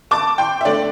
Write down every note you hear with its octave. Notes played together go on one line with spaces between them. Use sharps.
A5 D6
G5 C6
E5
D3 A3 D4 D5